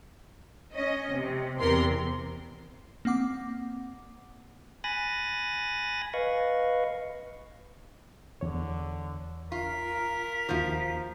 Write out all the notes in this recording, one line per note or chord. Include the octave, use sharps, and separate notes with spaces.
C#4 D#5
C3
E2 C3 A#4 C6
A#3 C4 F#5 D6
G#5 B5 D#6 F#6 A6 A#6
B4 D#5 F5 C#6
E2 D3 C#5
F4 A#4 B6
D#2 F3 F4 F#4